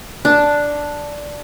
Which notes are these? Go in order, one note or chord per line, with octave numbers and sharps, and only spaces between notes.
D4